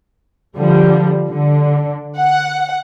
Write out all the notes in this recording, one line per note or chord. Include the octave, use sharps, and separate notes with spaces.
D3 F3 G3
D3
F#5